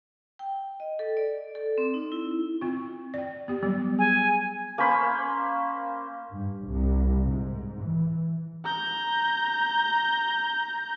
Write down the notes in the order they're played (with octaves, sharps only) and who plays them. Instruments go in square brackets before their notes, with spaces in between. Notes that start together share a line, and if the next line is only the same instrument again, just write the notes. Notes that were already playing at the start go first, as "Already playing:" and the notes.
[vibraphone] G5
D#5
A4
D5
A4
C4
D#4
E4
[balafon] C4 F4
D5 G5
B3 G4
F#3 G3 B3
[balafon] G#4 [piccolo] G#5
[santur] A#3 C#4 C5 B5
[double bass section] G2
C2
G#2
E3
[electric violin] A#5 G6